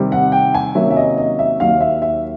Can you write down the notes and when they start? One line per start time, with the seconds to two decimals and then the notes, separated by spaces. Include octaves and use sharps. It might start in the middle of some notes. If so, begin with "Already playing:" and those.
Already playing: C3 D#3 G3 C4
0.12 F#5
0.32 G5
0.54 G#5
0.75 C3 D#3 F#3 A#3 C#4 E5
0.91 E5
0.97 D#5
1.17 D#5
1.39 E5
1.60 D#2 D#3 F#3 F5
1.81 E5
2.02 E5